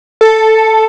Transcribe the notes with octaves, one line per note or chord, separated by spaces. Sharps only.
A4